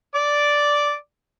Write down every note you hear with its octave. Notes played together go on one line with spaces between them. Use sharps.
D5 D6